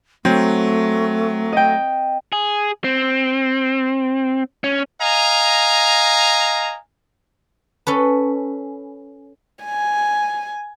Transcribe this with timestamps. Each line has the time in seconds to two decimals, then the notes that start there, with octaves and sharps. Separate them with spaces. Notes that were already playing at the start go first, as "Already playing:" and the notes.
0.25 F#3 A3 C4
1.52 D#5 G5
2.33 G#4
2.84 C4
4.64 C#4
5.02 D#5 F5 G#5 A#5
7.87 C#4 A4 B4
9.65 G#5